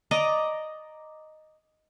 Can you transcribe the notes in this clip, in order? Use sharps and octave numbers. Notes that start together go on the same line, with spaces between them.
D5 D#5 A#5